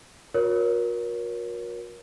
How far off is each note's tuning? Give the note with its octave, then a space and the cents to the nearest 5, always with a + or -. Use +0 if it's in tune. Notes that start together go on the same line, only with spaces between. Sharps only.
F#4 -40 A#4 +30 C#5 +0